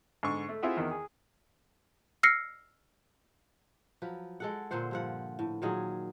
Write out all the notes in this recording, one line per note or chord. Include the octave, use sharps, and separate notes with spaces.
G#2 D3 C#6
A3
C4 E4 F4 G#4 E5 F#5
E2 D#3
G#4
E6 F6 A#6 C7 C#7
F3 F#3 B4
G#3 A4 F#5
A#2 D3 C5 F#5
G2 F3 F#5
A2
A#2 D#3 F#3 G#4